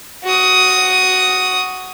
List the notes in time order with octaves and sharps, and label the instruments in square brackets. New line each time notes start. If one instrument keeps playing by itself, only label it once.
[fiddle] F#4 D#6